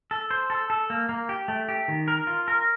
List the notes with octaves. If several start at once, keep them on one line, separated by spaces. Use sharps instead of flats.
A4
C5
A4
A4
A#3
A#3
G4
A3
G4
D#3
A#4
F4
A#4